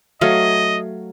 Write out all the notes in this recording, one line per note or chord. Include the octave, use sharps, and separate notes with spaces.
F#3 A3 D#5 F5